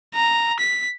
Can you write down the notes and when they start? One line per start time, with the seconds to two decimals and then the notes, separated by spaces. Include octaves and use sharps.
0.15 A#5
0.60 B6